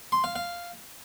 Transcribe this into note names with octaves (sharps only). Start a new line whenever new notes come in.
C6
F5
F5